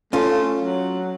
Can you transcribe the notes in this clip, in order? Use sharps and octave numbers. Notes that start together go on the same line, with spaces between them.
A3 C#4 F4
F#3